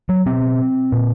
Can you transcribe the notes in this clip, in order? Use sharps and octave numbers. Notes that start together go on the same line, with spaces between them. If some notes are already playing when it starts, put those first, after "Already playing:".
F#3
B2 C4
A#2